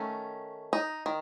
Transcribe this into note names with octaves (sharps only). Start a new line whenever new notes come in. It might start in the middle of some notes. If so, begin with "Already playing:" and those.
Already playing: D#3 A3 C#4
D#4
D#3